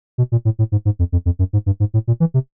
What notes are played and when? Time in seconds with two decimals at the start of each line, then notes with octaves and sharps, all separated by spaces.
0.18 B2
0.32 A#2
0.45 A2
0.59 A2
0.72 G#2
0.85 G#2
0.99 F2
1.12 F2
1.26 F2
1.39 F#2
1.53 G#2
1.66 G2
1.80 G#2
1.94 A2
2.07 A#2
2.20 E3
2.34 C3